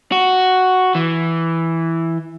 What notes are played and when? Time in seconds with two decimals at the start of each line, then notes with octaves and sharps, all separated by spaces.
0.12 F#4
0.95 E3